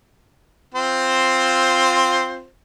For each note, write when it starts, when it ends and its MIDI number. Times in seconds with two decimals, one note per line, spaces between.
0.74 2.46 60
0.74 2.46 65
0.74 2.46 72